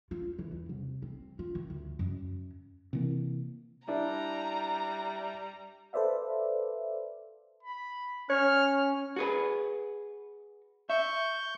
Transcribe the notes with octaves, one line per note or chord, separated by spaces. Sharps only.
F4
E3
E2
C2
C4
F4
D#3
D2
F#2
C3 E3 A#3
G3 D4 E4 A#5
A4 B4 C5 D5 E5 F5
B5
C#4 C#5 F6
F#4 G#4 B4
E5 C#6 G6